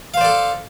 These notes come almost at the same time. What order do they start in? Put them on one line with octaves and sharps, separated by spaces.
F5 C5 D5 A4